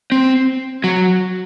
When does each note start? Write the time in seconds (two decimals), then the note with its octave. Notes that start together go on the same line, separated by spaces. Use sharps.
0.12 C4
0.84 F#3